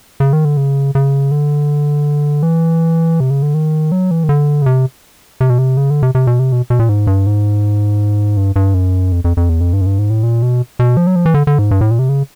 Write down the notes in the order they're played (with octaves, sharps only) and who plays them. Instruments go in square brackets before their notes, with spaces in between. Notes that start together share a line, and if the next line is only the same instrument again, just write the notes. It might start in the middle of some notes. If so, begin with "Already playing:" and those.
[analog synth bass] C#3
D#3
D3
C#3
C#3
D3
E3
C3
C#3
D3
D#3
F#3
E3
D#3
D3
C#3
C3
C3
B2
C3
C#3
D3
C3
C3
B2
C3
B2
B2
A#2
G#2
G2
G#2
G2
G2
F#2
F2
F2
F2
E2
F2
G2
F#2
G2
G#2
A2
A#2
B2
B2
F3
F#3
F3
E3
D3
D3
G#2
G2
A2
A#2
C3
C#3